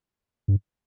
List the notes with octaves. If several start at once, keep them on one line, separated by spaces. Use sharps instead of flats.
G2